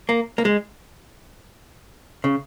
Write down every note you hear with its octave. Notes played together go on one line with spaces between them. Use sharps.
A#3
A#3
G#3
C#3